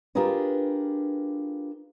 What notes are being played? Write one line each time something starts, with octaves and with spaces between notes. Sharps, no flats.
D4 F4 G4 G#4 A#4 B4